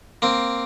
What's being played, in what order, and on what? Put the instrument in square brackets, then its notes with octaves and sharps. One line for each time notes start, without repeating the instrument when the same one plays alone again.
[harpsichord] A#3 C4